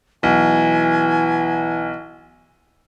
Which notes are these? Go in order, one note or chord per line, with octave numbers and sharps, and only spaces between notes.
B1 E3 G#5